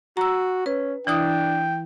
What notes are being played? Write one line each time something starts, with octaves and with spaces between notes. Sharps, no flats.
F#4 A#5 E6
C#4 B4
E3 D4 E4 G5 D#6